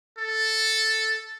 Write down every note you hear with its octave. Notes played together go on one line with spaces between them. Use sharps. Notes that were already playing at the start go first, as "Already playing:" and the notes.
A4